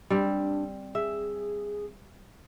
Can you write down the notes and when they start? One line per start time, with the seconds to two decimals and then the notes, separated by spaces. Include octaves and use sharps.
0.10 G3 C4 D4
0.95 G#4 E5